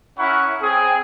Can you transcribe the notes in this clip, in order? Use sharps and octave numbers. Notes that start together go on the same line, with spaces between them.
C#4 E4 A#4 F#5 B5 C#6
C4 G#4